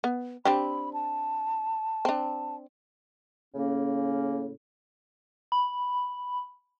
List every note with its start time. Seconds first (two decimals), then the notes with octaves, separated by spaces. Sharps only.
0.04 B3
0.45 C4 D4 G4 B5
0.93 A5
2.05 C4 D4
3.55 A2 C#3 A#3 C#4
5.52 B5